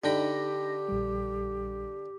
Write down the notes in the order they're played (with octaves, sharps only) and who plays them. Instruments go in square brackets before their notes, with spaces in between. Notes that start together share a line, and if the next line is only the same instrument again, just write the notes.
[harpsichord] D3 G5 B5 [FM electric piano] D4 D#4 A#6 [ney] G4
[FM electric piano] A#1 G3